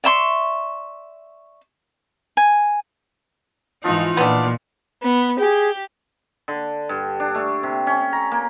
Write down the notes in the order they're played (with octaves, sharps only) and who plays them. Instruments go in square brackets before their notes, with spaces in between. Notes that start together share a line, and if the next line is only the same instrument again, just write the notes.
[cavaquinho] D5 E5 C6 C#6
G#5
[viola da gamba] G#2 E3 D#4 [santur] F3 F4 D#5
[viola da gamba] A#2 [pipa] B3 D4
[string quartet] B3
[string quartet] G4 [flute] G#4
[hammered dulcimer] D3
G2
D4
A3
C3
C#4
A#5
A#3